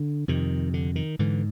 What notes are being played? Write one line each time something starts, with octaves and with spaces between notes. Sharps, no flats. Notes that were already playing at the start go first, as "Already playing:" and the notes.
Already playing: D3
F2 C3 D#3
D3
D#3
G#2 D3 E3